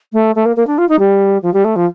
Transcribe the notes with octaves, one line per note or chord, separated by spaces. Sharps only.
A3
A3
A#3
A#3
D4
F4
D#4
G3
F3
G3
A3
F3